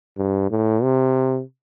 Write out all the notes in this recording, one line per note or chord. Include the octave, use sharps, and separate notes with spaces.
G2
A2
C3